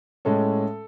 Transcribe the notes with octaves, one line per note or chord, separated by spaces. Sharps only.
A2 G#3 C#4 A4